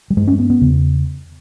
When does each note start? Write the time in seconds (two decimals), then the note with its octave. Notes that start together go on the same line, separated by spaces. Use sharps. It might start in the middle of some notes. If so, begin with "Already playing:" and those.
0.10 G3
0.17 G2 G#3
0.28 C#4
0.39 B3
0.50 B3
0.61 E2 C#3